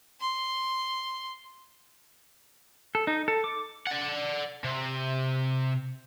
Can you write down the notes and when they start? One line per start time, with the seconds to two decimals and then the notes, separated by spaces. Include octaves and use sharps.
0.20 C6
2.95 A4
3.07 D#4
3.28 A4
3.44 D6
3.87 D5 F#5
4.64 C3